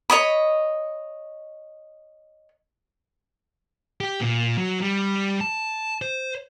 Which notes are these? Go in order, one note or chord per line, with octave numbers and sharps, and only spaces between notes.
C#5 D#5 B5
G4
A#2
F#3
G3
A5
C5